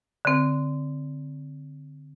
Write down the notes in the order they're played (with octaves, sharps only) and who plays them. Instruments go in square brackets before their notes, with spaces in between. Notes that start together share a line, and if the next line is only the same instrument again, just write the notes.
[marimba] D3 C4